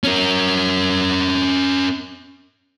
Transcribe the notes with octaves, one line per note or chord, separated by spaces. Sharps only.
C#4 A#4